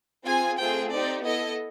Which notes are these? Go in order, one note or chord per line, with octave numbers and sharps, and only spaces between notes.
C4 F4 G#4 G#5
A3 C4 F4 G#4 G5
C4 D#4 G4 D5
B3 E4 A4 D#5